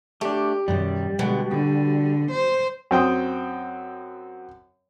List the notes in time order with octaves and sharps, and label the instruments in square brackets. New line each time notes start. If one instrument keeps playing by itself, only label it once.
[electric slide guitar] A3 D4 [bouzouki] G4
[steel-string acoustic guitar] F#2 B2 D#3 [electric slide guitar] G3
[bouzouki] B2 [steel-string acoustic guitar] D3 G#3 B3
[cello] D3 [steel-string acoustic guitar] G5
[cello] C5
[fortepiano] F#2 C4 G5 D#6